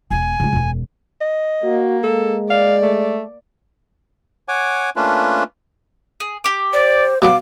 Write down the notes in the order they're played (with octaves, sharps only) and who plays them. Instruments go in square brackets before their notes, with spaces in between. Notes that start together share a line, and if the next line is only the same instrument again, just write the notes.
[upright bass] E1 B3 [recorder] G#5
[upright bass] C#3 G#3
E1 F#2
[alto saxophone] D#5
[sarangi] A#3 [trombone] F#4
[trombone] G#3 [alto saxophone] A4
[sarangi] D5 [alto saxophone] F5
[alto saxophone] A3
[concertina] C#5 F#5 G#5 D6
A3 A#3 C#4 D4 F4 B4
[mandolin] G#4
G4 D6
[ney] C5 [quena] D5
[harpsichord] B2 F#3 B3 [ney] F5 [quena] D6